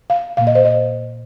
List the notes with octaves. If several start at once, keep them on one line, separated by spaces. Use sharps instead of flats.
F5
A#2 A#3 F5
D#5
C5
D#5